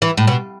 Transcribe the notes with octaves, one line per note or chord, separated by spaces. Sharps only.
E3
A2
B2